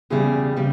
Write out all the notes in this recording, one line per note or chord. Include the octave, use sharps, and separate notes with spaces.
E2 C#3 G3 G#4
C#3 G3